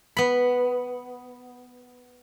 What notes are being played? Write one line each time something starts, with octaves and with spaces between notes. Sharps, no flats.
B3 B5